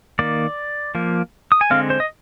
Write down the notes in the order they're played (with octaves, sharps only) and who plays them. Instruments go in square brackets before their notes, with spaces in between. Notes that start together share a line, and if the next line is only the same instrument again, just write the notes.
[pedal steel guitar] D#3 A#3 D5
F3 A#3
D#6
G#5
D3 G#3 C4 F5
C5
D#5